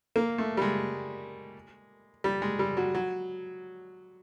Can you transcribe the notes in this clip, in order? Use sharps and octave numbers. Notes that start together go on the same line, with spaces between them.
A#3
A3
G3
G#3
G3
G#3
G3
F#3
F#3